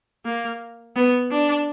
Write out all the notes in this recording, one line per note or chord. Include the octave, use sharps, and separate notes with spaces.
A#3
B3
D4